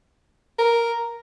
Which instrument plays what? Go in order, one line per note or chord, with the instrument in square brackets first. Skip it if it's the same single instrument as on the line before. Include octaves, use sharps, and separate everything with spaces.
[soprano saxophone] A#4